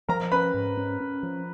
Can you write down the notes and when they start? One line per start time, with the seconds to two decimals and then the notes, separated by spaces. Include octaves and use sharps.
0.09 F3 A#4 A#5
0.32 C#4 B4 B5
0.54 G#2
0.77 C#4
1.00 C#4
1.23 F3